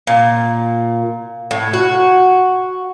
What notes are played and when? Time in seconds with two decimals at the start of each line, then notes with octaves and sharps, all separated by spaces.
0.07 A#2
1.51 A2
1.73 F#4